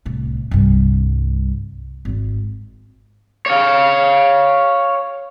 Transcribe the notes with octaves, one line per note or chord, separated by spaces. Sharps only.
C2 A2
C2 G2
G#1 D#3
C#5 F5